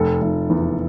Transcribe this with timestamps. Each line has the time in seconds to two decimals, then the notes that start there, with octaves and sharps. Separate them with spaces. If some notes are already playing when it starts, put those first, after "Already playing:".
Already playing: F1 A4
0.21 F1
0.50 E2